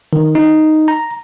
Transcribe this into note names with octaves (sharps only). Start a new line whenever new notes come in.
D#3
D#4
A#5